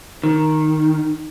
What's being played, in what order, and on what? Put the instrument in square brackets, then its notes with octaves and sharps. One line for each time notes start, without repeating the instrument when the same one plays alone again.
[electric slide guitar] D#3